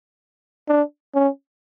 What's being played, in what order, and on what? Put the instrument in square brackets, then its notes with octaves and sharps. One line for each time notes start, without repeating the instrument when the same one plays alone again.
[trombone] D4
C#4